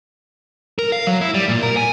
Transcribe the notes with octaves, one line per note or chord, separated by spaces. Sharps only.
A#4
F5
F#3
E4
G3
A#2
A#4
G#5